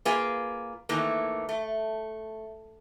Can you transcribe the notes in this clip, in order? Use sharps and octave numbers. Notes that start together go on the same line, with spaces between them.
A#3 F4 G#4 B4
D#3 E3 A3 A#3
A3